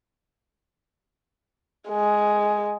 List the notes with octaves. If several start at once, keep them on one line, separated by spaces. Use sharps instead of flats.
G#3